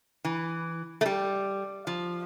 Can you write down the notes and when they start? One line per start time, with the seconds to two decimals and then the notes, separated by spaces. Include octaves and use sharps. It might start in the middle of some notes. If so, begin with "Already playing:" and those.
0.25 E3
1.01 A3
1.06 G3
1.87 F3